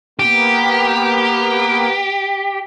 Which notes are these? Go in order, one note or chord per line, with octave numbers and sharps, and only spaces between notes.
A#3 B3 G4